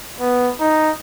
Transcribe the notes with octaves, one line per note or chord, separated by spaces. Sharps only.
B3
D#4